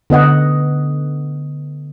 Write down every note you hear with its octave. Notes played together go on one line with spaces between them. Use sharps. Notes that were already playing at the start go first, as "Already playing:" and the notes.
D3 B3 D#5 F#5